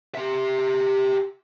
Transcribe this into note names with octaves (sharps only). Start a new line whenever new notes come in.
G4 E5